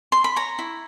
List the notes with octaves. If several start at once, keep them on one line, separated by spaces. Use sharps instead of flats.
C6
B5
C#5 A#5
E4